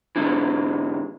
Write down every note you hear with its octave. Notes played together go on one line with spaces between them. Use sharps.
G#2 D3 E3